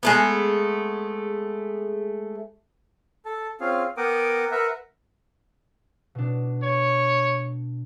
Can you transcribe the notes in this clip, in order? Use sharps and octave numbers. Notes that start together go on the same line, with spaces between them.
G#3 A3 B3
A4 A5
C4 C#4 F4 G#4 F5
B3 A#4 F#5 G5 D6 D#6
A#4 B4 E5 F#5
B2 D4
C#5